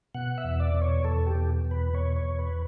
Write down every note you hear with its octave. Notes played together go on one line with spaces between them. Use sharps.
B2 F#5
E5
E2
D5
B2
C#5
E2 A4
G4
B2
E2
B4
B2 C#5
C#5
E2
B4